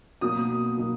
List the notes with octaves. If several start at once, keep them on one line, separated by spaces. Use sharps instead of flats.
B2 F#3 A#3 D#6
B2 F#3 A#3